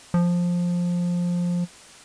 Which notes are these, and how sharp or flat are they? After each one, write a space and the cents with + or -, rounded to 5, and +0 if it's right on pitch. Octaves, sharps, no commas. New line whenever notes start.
F3 +10